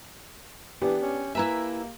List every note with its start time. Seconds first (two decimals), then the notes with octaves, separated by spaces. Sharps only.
0.82 E3 B3 D4 G4
1.02 C#4
1.35 A#3 E4 B4 E5 G#5 A#5